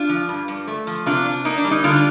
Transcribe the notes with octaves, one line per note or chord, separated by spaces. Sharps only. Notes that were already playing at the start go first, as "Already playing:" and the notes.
Already playing: D4 F4
F3
G2
G2
A3
F3
C3 D4 F4
D4
A#3 D#4
D4
G3
D#4
D3 D4 F4